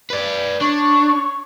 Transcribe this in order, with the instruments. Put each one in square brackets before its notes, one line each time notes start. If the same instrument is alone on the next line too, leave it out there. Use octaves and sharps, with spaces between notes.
[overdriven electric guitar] B4 D5
[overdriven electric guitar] D4 [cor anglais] C#5 [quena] C#6